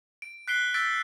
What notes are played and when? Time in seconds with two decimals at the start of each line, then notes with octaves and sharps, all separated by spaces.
0.22 D7
0.48 F#6 B6 C7 D7 G7
0.74 E6 G6 A6 B6 D7